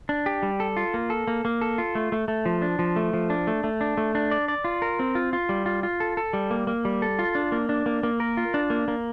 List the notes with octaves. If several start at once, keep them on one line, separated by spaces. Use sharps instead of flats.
D4
G4
G3
A4
F4
A#3
A4
A#3
A#3
A4
F4
A3
A3
A3
F3
D4
F3
A3
F3
D4
A3
A3
D4
A3
D4
D5
D5
F4
A#4
C4
F4
F4
G3
F4
F4
A4
A4
G3
A#3
A#3
G3
A4
F4
D4
A#3
D4
A#3
A#3
A#4
F4
D4
A#3
A#3